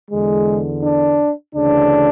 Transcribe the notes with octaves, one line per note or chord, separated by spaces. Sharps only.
E2 D3 G#3
D4
D2 C#3 E3 D4